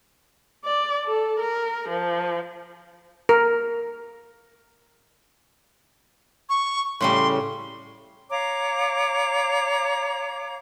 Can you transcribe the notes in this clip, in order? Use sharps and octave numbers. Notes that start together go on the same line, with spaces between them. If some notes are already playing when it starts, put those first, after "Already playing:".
D5
A4
A#4
F3
A#4
C#6
A2 C#3 G3 C6
C#5 F5 A#5 D6